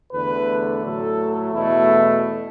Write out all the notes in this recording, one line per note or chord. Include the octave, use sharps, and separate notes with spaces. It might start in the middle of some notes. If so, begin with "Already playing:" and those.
E2 D3 A3 B4
A2 F#3 A3 A4
E2 B2 A3 E4